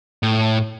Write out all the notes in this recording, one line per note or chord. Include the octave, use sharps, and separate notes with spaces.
A2